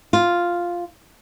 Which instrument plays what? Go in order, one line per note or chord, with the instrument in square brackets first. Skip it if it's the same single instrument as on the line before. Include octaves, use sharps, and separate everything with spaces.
[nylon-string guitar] F4